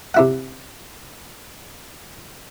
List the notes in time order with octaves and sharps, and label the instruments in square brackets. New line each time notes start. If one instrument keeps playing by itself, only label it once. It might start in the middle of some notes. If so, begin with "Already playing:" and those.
[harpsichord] C3 E4 F#5